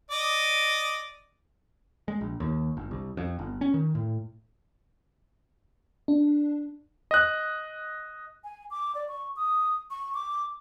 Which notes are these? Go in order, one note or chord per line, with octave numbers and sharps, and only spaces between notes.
D5 D#5
G#3
A#1
D#2
G1
C2
F2
G1
C#4
D#3
A2
D4
D#5 F#6
G#5
D6
D5
C#6
D#6
C#6
D6